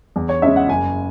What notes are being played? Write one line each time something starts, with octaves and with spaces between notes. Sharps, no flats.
E2
C#5
C#3 G#3 C#4 E5
F#5
F#1 G#5